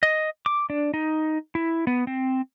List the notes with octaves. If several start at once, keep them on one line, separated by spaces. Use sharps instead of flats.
D#5
D6
D4
D#4
E4
B3
C4